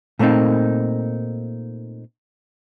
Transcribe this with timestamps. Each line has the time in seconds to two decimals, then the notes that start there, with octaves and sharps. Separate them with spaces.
0.19 A#2 A3 A#3 C4 D#4